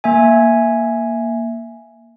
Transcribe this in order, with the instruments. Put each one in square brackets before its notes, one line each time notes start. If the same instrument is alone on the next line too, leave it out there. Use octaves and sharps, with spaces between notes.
[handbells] A#3 E5 G#5